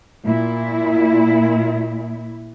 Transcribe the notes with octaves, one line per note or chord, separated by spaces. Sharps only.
A#2 E4